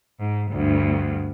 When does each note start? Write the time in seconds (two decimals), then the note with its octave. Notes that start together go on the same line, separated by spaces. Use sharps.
0.19 G#2
0.52 D2 G2